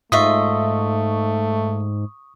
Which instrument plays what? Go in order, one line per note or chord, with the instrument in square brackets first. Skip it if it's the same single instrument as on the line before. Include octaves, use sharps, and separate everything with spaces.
[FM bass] G#2 [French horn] A3 [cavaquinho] F4 D#5 E5 [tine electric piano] C#6 D#6